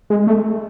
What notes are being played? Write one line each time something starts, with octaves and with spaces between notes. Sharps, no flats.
G#3
A3